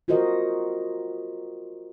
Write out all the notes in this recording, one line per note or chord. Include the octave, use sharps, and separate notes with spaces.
F4 F#4 A#4 C5 D#5